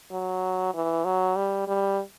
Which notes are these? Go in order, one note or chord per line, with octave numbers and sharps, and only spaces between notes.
F#3
E3
F#3
G3
G3